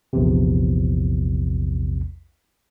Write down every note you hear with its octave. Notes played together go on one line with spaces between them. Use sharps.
A#1 E2 C3